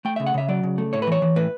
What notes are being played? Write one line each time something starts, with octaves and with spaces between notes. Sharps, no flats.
A3 G5
C#3 E5
F#5
C#3 E5
F#3 D5
C#3
A3
A2 C#5
B4
E3 C#5
E3
A2 B4